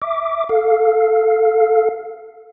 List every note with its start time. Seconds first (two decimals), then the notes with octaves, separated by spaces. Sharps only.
0.02 E5 D6
0.49 A4 F5